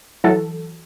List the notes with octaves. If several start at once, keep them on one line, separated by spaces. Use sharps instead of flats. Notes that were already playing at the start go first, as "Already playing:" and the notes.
E3 F#3 A4